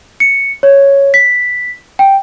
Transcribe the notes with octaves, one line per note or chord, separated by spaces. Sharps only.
C#7
C#5
B6
G5